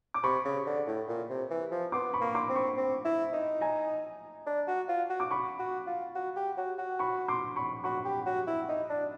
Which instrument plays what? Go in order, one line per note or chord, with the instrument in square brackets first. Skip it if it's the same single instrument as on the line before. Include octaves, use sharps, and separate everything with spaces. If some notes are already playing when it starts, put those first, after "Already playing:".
[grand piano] D6
[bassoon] C3 [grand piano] B5 C#6
[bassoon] C#3
D3
A2
A#2
C3
E3
F3
[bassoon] B3 [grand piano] C6 D6
[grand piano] B5 C#6
[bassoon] A#3
[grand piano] C6 D6
[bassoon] C4
[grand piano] B5 C#6
[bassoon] C4
E4
D#4
[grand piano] G#5 A#5
[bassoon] D4
F#4
F4
F#4
[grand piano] D6
B5 C#6
[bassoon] F#4
F4
F#4
G4
F#4
F#4
[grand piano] B5 C#6
C6 D6
B5 C#6
[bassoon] F#4 [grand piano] B5 C#6
[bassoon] G4
F#4
E4
D#4
D4